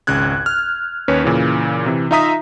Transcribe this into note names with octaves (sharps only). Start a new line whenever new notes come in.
G#1 C#2 C#3 F#6 G#6
F6
D#2 C#4 B4 C#5
A#2 C#3 E3
C3 E3
D#4 F4 E5 A#5 D#6 B6